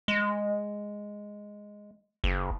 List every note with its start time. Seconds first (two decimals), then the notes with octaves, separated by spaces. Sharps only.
0.08 G#3
2.24 F#1